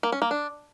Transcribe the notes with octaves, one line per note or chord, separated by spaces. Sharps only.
A#3
C#4
A#3
D4